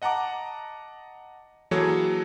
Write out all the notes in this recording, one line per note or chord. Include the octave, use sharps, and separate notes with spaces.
D#5 F#5 A5 A#5 D6
E3 F#3 A#3 G#4 A4 C#5